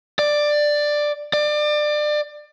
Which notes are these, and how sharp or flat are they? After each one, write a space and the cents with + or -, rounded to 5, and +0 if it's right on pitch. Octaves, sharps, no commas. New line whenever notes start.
D5 +10
D5 +25